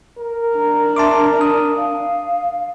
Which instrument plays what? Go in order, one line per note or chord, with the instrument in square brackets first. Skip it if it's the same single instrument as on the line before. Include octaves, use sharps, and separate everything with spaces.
[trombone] A#4
[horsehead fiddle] D4 [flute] A#5
[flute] E5 [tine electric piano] A5 C6 D6
[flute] A5 [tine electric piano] D#6
[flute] F5